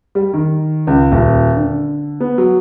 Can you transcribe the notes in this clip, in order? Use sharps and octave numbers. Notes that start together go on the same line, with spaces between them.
G3
D#3
C#2
D#1
D3
B3
F#3